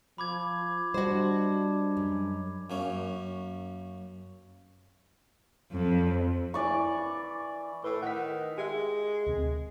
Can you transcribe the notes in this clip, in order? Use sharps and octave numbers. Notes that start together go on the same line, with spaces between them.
F3 B5 D6 G#6
G3 D4 F#4 C5 D#5
F#2
F#2 A#3 C#4
F2
E3 D5 C#6
A2 B4
D#3 F#5 B6
G#3 G4 E5
D2 C3